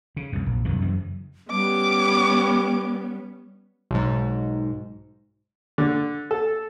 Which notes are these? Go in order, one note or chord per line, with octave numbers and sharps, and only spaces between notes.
C#3
C2 F#2
A#1
C2 F#2 B2 D#3
F#2 C#3 E3
G3 B3 C#4 D6
B1 G#2
D3
A4